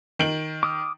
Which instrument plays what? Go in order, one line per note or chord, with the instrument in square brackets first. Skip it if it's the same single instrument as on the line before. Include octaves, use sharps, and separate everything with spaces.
[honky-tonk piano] D#3 D7 F#7
[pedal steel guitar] D6 D#6 F6